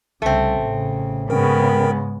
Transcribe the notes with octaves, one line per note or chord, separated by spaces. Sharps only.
C2 C#3 A3 C4
A1 C#3
G#2 C#3 G#3 B3 A#4 G5